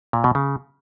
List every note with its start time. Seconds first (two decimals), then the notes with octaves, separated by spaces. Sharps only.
0.13 A#2
0.24 B2
0.35 C#3